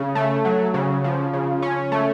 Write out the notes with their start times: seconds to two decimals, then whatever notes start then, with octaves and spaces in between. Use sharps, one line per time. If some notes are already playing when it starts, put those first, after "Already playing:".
Already playing: C#3
0.15 A3
0.45 F#3
0.74 C#3
1.04 F3
1.33 C#3
1.62 C#4
1.92 A3